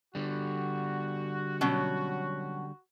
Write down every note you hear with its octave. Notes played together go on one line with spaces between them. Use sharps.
D3 G3 F#4
B2 F#3 C#4